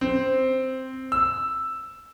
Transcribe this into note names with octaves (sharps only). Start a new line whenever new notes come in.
C4
E6